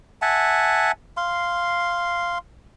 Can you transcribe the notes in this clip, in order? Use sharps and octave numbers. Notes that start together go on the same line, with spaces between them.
E5 F#5 G#5 A5
F5 C6